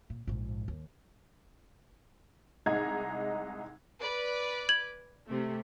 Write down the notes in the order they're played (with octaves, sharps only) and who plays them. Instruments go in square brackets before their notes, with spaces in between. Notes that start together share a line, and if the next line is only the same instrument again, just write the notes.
[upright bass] A#2
A#1 G#2
D#2
[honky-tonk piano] C2 G#3 D#4 G#4 A#5 G#6
[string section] B4 D5
[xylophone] G#6 F#7
[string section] C3 A3